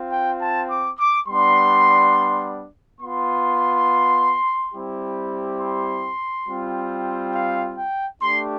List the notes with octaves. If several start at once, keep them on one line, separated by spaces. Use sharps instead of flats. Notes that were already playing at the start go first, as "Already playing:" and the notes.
Already playing: C4 F4
G5
A5
D6
D6
G3 B3 D4 C6
B3 F4 C6
G3 C4 E4 G4
C6
G3 C4 F4
F5
G5
A3 D4 G4 C6